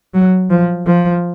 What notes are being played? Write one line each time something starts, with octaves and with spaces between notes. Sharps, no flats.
F#3
F3
F3